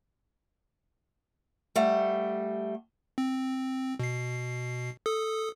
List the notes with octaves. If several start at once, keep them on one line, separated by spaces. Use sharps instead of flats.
G3 A3 F#5
C4
B2 C7
A4 D#6